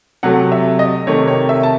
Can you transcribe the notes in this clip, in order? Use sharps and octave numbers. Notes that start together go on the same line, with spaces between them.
C3 F#3 A3 F#5
E5
D#5
C3 D#3 A3 C#5
C#5
E5
A5